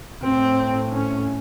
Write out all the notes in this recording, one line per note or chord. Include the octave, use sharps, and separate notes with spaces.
A2 C4
C#4